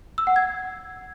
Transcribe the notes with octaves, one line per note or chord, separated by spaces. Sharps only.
E6
F#5
G#6